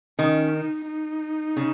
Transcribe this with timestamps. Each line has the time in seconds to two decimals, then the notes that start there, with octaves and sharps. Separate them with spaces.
0.19 D#3 C#4
0.54 D#4
0.88 D#4
1.56 C#3